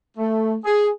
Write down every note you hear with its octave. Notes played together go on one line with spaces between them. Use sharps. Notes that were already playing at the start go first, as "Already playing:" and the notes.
A3
G#4